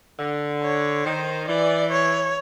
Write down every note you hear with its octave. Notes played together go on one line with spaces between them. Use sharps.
D3
C#5
D#3 C5
E3 D5
C#5